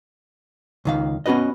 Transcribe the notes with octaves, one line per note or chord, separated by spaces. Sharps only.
C#2 D#3 F5
B3 C#4 F#4 B4 D#5